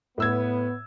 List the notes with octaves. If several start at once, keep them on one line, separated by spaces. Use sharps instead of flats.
A2 B3 E6 G#6